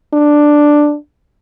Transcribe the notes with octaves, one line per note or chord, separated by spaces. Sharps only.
D4